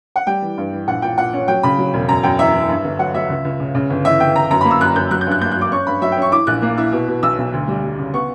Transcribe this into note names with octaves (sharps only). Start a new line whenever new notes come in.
F#5
G3 G5
E3
G2
E3
A#1 F#5
A#2 G5
A#2 F#5
C#4
F#3 G5
C#3 B5
F#3
E1
F#2 A#5
F#2 G5
E3 E5
E3
G2
G1
F#3 F#5
F#3 E5
C#2
C#2
C#3
C#3
G1
E3 E5
G1 G5
G1 A#5
F#2 A#5
B5
A#3
E6
F#2 F#6
F#2 G6
F#3 F#6
G6
G2
F#6
A#3 G6
F#6
F#3
D6
C#4 C#6
G2 B5
F#3 E5
G5
C#4 C#6
E4 D6
A#1 F#6
A#3
E4
B2
B2
B1 E6
B1
D2
G3
G3
C#3
B3 C#6